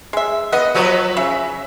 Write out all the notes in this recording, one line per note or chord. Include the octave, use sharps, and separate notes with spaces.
G#3 E5
B3 D#5 F#5
F3 F#3 B4
C#3 E5